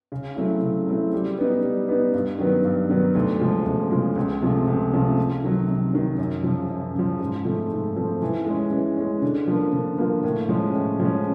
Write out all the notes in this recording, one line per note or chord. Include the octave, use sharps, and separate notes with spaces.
C#3
F#3 A3 C4 E4
C#3
F#3 A3 C4 E4
G3
B3 D#4
G3
B3 D#4
G2
D#3 F#3 B3
G2
D#3 F#3 B3
D2
C#3 F3 G#3
D2
C#3 F3 G#3
C#2
C3 F3 A3
C#2
C3 F3 A3
C3
D#3 F#3
C3
D#3 F#3
F#2
C#3 F3
F#2
C#3 F3
G#2
F3 A3 C4
G#2
F3 A3 C4
E3
G#3 C#4
E3
G#3 C#4
D3
F3 A#3
D3
F3 A#3
A2
F3 G#3 C#4
A2
F3 G#3 C#4